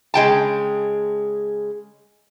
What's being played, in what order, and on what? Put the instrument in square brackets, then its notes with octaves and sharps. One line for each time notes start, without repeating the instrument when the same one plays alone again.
[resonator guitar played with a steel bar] C#3 G#3 G5 A5